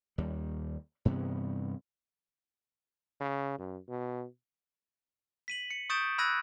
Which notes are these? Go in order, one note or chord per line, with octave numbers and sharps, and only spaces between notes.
D#2 G3
G2 C3 E3 B3
C#3
F#2
B2
B6 D#7 F#7
C#7
C#6 D#6 G6 A6 D7 E7
B5 E6 F#6 G#6 A#6 D#7